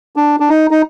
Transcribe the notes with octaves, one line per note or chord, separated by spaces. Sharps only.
D4
D4
D#4
D#4